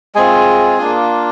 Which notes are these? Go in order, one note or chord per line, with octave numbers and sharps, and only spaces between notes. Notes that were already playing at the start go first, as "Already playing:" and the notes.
G#3 C4 F4 G#4 G#5
A#3 D4 F4